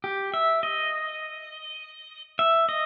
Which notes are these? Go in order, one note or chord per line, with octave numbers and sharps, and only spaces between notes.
G4
E5
D#5
E5
D#5